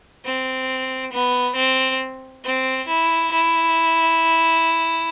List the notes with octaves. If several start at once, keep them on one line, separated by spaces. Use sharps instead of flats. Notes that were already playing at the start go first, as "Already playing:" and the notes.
C4
B3
C4
C4
E4
E4